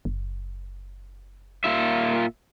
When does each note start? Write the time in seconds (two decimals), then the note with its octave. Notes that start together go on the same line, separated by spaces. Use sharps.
0.05 F#1
1.64 A#2 F4 E5